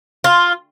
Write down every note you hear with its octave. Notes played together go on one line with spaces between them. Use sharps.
F4